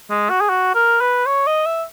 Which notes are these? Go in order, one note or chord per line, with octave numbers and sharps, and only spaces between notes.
G#3
F#4
G#4
F#4
A#4
B4
C#5
D#5
E5